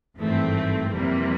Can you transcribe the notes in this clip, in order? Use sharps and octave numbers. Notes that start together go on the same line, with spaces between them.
G#1 G2 E3 A3 C4
F2 C3 E3 G3 A#3